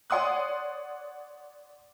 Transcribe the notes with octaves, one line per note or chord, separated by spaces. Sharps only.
C#5 D5 F#5 C6 D#6 F#6